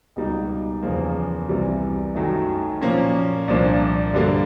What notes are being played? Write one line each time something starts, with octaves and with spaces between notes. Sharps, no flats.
C#2 B2 G3 A#3 D#4
E2 C#3 F3 A#3
C2 C3 E3 G3 A#3
F#2 D#3 F#3 A3
A#2 F3 A#3 C#4
C2 A#2 F3 A#3 D4
G2 D3 G3 A#3